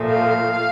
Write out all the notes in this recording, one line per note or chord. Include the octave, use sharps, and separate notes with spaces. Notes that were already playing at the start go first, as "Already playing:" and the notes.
Already playing: A#2 F3 A3
F5